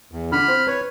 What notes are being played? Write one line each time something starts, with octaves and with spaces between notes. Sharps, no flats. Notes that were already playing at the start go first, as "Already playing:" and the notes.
E2
D3 B5 F6
C4
B4 C#5